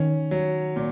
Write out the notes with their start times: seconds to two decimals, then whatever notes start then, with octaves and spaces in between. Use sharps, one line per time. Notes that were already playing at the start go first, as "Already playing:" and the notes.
Already playing: D#3 C#4
0.31 F#3
0.76 A#2